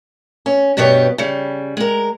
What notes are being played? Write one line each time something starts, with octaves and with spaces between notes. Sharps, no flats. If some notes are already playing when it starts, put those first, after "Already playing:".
C#4
G2 B2 G3 B3 G4 C#5
C#3 G3
G#3 A#4